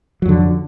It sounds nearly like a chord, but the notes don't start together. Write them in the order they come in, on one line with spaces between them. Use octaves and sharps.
F#3 F2 D3